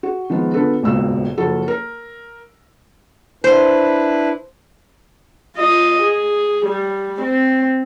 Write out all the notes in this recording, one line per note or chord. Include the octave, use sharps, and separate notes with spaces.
F#4
D#3 F3 G#3 B3
D3 B3 F4 A4 B4
D#1 G#1 C#2 B2 E6
F#1 F3 F#4 A4
A#4
D4 E4 B4 C5
F4 D#5
G#4
G3
C4